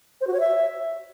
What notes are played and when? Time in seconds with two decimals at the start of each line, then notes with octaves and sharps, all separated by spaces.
0.21 C5
0.27 F#4
0.34 C#5
0.40 E5